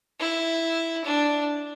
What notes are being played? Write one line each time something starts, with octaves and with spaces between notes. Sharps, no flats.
E4
D4